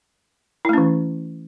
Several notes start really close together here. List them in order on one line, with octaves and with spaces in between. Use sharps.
E4 A3 C#4 E3